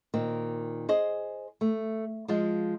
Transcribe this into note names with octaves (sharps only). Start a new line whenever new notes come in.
A#2 D#3 C4
G#4 C5 D#5
A3
F3 G#3 F4